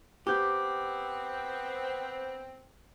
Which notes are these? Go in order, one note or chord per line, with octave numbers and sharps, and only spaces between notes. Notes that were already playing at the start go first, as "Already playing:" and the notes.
B3 C4 G4 D6 G6